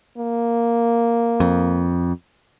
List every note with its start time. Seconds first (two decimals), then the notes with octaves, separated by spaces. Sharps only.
0.18 A#3
1.40 F2